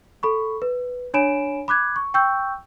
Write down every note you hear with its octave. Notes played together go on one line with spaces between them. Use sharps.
A4 B5 C#6
B4
D4 C#5 G#5 B5 D7 E7
B5 D6 F#6 G#6
C#6
G5 C#6 E6 G6